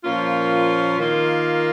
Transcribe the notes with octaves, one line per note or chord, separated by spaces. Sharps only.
A#2 F3 A#3 C#4 F4
D#3 A#3 F4